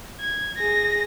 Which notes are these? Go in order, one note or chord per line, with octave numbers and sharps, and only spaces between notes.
G#6
G#4 A#6